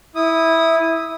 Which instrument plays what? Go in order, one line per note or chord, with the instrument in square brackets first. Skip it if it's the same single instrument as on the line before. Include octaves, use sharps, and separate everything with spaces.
[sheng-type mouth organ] E4 D#6